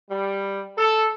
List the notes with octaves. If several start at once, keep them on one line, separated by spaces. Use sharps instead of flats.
G3
A4